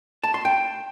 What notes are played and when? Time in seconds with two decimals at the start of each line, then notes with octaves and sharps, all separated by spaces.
0.23 A5
0.34 C6
0.45 G5